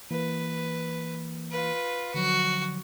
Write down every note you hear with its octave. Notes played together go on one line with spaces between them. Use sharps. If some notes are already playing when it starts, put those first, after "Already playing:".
E3 A#3 B4
F4 B4
D3 F3 F#3 F#4